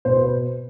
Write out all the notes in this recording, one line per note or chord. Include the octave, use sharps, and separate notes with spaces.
B2 C5
B4